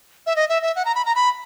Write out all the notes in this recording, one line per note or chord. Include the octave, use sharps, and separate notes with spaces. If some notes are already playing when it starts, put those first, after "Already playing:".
E5
D#5
E5
E5
F#5
A#5
B5
A#5
B5